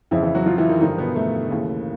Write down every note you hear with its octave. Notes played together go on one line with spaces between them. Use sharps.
F2 C#3 E3 F3 E4
E3 E4
F#3 F#4
F3 F4
E3 E4
D#3 D#4
G2 D3 D#3 F3 D#4
B2 B3
A3
D#2 C#3 E3